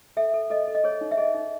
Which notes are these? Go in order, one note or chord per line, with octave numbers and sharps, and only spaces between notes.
A4 E5
A4
A4 D#5
A4
D#5
G#4 C#5
D#4
E5
G#4 D#5
D#4